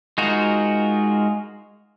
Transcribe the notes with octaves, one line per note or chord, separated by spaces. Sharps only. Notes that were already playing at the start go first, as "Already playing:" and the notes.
G#3 D#4 F4 F#4 A#4